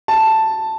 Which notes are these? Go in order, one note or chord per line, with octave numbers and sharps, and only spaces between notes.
A5